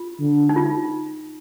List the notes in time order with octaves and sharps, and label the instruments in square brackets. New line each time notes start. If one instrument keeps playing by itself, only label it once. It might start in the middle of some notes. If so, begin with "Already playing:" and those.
Already playing: [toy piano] F4
[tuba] D3
[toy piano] D#4
F4